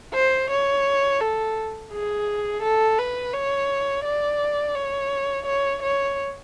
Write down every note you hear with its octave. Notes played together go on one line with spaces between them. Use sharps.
C5
C#5
A4
G#4
A4
B4
C#5
D5
C#5
C#5
C#5